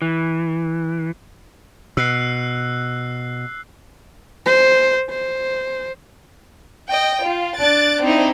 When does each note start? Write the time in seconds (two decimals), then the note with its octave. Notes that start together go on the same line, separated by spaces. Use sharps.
0.02 E3
1.97 B2 E6 F#6 C7
4.46 C5
5.09 C5
6.90 D#5 G5
7.26 F4
7.59 D4 F#6 A6 D7
8.03 C4 D#4 E4